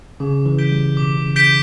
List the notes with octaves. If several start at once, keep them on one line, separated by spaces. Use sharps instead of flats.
C#3 D6
E3
G6 B6 D7 G7
G3
B2 D6
C#3
C#3 G6 B6 D7 G7